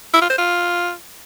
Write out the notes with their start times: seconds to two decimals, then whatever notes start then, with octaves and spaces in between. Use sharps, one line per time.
0.14 E4
0.22 F4
0.30 C5
0.38 F4